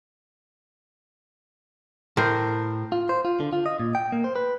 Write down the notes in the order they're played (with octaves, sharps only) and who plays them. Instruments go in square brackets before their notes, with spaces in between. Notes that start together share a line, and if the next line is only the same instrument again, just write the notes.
[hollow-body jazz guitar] A2 [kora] A#4 C5
[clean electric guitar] F4
C5
F4
D3
F4
D#5
A#2
G5
A#3
C5
B4